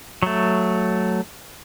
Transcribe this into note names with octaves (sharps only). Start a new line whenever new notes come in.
F#3 A3